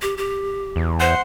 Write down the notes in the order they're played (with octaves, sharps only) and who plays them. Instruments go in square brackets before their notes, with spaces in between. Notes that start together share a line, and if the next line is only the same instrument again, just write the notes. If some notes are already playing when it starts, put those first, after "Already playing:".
[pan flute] G4
G4
[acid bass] E2
[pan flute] C5 [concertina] F#5 C6